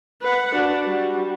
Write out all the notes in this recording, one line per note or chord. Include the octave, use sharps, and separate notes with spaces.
B4 F#5
D4 F#4
G3